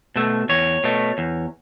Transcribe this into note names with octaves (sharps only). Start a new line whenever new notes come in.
B2 A3
E2 C#5
B2 A3
E2